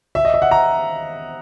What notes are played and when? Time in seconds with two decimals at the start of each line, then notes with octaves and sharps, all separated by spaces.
0.15 E5
0.25 D#5
0.34 E5
0.42 F#5
0.51 A#5